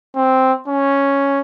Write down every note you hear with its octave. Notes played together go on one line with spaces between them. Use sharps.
C4
C#4